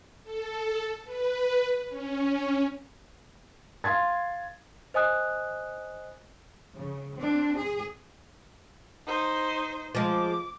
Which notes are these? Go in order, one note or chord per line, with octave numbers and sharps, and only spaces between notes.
A4
B4
C#4
F5 C6 G#6 A6
C5 D#5 G#5 D#6 F#6
C#3
C4 D4
G#4
D#4 C5
F3 G#3 D6